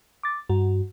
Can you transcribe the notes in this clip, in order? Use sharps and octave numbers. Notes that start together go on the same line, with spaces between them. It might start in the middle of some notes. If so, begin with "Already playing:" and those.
D6 A6
G2 F#4